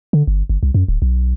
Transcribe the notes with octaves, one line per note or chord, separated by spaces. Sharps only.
D3
G1
G1
C2
F#2
D1
B1